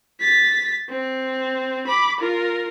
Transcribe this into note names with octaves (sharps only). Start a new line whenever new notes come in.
A6 B6
C4
B5 D6
F4 A#4